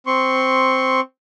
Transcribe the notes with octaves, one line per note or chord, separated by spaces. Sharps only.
C4 C6 C#6